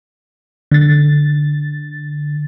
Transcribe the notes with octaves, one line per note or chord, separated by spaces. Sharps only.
D3 A6